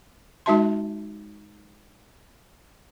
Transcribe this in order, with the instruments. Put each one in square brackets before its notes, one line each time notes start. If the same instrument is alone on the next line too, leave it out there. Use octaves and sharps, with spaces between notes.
[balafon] G#3 D#4 F#4 E5 A5 C6